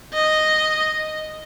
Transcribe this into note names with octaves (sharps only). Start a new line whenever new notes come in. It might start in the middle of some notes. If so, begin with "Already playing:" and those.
D#5